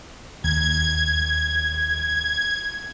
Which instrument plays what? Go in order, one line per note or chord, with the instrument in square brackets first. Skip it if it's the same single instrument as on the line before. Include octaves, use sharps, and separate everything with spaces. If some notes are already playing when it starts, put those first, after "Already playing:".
[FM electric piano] D#2 [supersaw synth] G#6